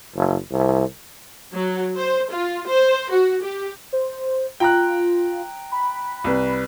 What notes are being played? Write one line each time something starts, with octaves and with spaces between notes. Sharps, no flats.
F#1
C2
F#3
C5
F4
C5
F#4
G4
C5
F4 G5 A#5 F#6
B5
C2 B4